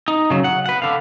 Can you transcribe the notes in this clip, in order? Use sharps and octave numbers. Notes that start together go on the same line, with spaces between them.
D#4
C#3 F#3
F#5
B4 F#5
D3 F5